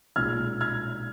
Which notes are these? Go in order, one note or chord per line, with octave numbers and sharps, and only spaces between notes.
B1 A#2 G#3 F6 G#6
F6 G#6